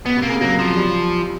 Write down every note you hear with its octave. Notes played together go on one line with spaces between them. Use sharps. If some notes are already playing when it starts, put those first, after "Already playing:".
B2 B3
C3
A#3
C#3
F#3 A#3
F3
G3